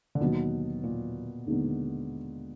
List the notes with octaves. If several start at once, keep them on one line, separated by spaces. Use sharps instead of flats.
D3
D#2 B2 D#3 F#3
A#2
D#2 D3 G#3 B3 D#4